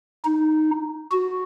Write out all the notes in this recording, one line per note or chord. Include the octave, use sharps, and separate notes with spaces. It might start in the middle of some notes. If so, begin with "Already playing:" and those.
D#4
F#4